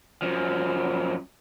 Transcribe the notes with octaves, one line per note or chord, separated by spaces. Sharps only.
F#2 F3